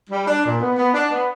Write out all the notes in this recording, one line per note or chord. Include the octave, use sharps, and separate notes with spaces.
G3
D4
A#2
B3
B3
D4
B3